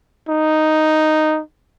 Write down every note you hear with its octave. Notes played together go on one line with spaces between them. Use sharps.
D#4